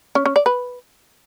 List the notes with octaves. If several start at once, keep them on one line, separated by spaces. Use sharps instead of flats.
C#4
C#4
D5
B4